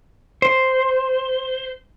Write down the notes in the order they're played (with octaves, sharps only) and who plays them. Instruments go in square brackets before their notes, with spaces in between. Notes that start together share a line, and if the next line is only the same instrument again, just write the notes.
[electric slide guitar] C5